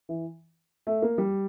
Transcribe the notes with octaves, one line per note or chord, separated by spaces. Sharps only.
E3
A3
A#3
G3